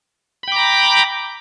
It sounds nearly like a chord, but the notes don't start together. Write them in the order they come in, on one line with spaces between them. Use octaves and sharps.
B5 G5 D6 A#5